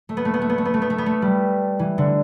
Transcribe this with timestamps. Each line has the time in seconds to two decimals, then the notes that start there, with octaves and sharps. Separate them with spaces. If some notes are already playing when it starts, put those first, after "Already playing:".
0.09 A3
0.17 B3
0.25 A3
0.34 B3
0.42 A3
0.49 B3
0.58 A3
0.65 B3
0.74 A3
0.82 B3
0.90 A3
0.98 B3
1.06 A3
1.22 G3
1.79 E3
1.98 D3